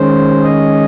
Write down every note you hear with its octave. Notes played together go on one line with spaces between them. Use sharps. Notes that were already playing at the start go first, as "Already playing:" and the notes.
Already playing: D#3 G#3 C#4 C5
D#5